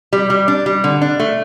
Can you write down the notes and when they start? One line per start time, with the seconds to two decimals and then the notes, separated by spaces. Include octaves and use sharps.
0.13 G3
0.30 G3
0.48 D4
0.66 G3
0.84 D3
1.02 D4
1.20 A3